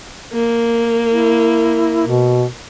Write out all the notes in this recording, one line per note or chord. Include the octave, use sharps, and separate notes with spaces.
A#3
E4
B2